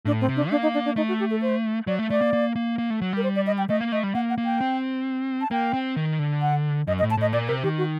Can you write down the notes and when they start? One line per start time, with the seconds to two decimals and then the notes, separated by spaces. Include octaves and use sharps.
0.05 A2 D4
0.21 C4
0.29 C3
0.36 D4
0.51 A#3 D4
0.63 D#4
0.74 D4
0.85 D4
0.96 A3 D#4
1.08 F#4
1.20 G4
1.30 A4
1.42 C5
1.87 F#3 D5
1.99 A3
2.10 A3 D5
2.21 A#3
2.33 A#3
2.56 A#3
2.78 A#3
2.90 A3
3.01 F#3
3.13 G3 A#4
3.24 C5
3.36 D5
3.47 D#5
3.58 G5
3.69 A3 D#5
3.81 A#3
3.92 A3 D#5
4.03 G3
4.15 A#3 F#5
4.30 F#5
4.38 A#3
4.45 G5
4.61 C4
5.41 A5
5.51 A#3 G5
5.73 C4
5.96 D#3
6.19 D3
6.42 F#5
6.87 F#2 D#5
6.99 D#5
7.03 A2
7.11 A5
7.17 A2 D#5
7.33 A#2 D5
7.48 C3 A#4
7.63 D#3 G4
7.78 F#4